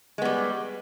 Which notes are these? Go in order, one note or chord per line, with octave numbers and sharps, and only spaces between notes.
G3 G#3 B3